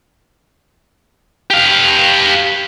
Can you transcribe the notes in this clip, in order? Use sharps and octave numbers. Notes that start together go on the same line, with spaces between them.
G4 F5